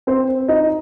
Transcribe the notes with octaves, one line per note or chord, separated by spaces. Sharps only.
C4 C5
D#4 D#5